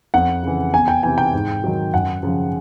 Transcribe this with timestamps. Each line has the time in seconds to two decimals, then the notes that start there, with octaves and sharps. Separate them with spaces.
0.14 F2 F#5
0.43 C#3 E3
0.73 E2 G#5
0.88 G5
1.03 C3 E3 G#5
1.18 G5
1.34 G#2
1.64 D#3 F#3
1.93 F#2 F#5
2.23 C#3 F3